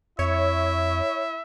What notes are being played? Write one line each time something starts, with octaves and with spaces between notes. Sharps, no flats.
F2 E4 C#5 E5